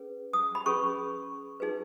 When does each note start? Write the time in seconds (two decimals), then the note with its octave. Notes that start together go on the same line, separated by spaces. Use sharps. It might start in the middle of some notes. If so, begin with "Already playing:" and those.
Already playing: C#4 G#4 B4
0.33 D#6
0.55 B5
0.66 C#4 G#4 B4 C#6
1.60 D#4 G#4 B4